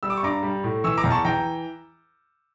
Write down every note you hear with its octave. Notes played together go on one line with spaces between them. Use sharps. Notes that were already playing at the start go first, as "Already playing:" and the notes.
G3 E6
D6
C#6
G2 A#5 D6
G3
A2
E3 C#6 E6
A#5 D6
E2
A5 C#6
E3 G5 A#5